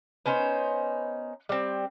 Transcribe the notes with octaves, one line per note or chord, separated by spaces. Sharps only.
B3 C#4 D#4 C5
G3 C4